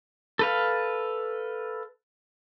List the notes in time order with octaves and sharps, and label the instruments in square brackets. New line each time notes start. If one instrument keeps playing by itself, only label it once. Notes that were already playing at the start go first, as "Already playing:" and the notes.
[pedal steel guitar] A4 B4 F5